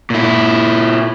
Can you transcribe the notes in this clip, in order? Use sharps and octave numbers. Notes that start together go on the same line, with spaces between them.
A#2 E4